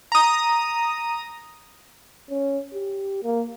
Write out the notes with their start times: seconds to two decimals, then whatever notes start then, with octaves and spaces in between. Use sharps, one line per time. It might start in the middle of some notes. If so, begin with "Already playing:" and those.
0.12 A#5 D#6
2.30 C#4
2.74 G4
3.23 A#3